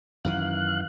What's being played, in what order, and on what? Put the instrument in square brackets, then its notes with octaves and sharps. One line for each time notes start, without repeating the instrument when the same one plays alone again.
[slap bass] F#2 D#3 E3 [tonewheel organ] F5 F#6